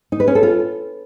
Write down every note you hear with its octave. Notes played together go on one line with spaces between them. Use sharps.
D#4
B4
C#4
A4
F4